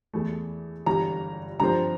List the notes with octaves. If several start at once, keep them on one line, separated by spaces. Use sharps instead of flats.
E2 E3 A3
G1 G2 E3 G3 A#5
G2 D3 F3 C4 A#5